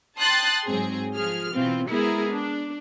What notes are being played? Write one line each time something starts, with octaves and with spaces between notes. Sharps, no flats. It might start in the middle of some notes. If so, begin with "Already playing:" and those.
G5 A5 C6 D#6 F#6 A6
G#2 F#3 C4 G#4
F3 G#4 F6
B2 E3 C4 F4
G#3 B3 E4 G#4 A#4
D4